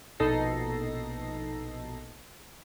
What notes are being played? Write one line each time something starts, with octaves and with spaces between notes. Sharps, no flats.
A#1 B2 D#4 A4 A#6 C7